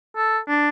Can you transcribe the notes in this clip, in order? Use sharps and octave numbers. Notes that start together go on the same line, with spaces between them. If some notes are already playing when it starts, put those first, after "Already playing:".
A4
D4